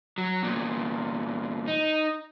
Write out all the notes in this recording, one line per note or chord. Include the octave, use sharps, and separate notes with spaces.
F#3
E2 A#2
D#4